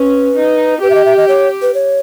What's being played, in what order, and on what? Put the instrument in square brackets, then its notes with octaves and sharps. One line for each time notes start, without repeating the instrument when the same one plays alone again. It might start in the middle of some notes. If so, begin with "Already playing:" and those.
Already playing: [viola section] C#4 [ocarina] B4
[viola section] D#4
[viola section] G4 [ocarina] B4
[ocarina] E5
D#5
E5
D#5
C#5
B4
C#5